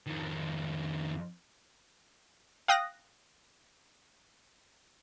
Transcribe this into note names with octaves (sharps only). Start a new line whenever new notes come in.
F2 D#3
F5 G5 D#6 F#6 A#6